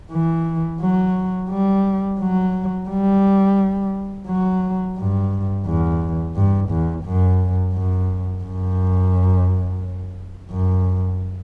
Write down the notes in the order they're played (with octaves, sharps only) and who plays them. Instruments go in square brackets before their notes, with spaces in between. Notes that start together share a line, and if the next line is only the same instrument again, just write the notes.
[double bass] E3
F#3
G3
F#3
G3
F#3
G2
E2
G2
E2
F#2
F#2
F#2
F#2